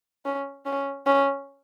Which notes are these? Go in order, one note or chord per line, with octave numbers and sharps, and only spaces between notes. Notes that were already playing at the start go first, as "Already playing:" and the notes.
C#4
C#4
C#4